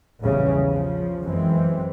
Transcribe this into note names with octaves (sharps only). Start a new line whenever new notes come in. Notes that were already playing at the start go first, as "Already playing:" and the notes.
A#1 E2 C#3 G3
C#3 F3
F#2 E3 G#3 C4